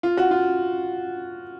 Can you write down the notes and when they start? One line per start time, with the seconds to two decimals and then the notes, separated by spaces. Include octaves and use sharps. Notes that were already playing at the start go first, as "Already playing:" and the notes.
0.03 F4
0.17 F#4
0.31 F4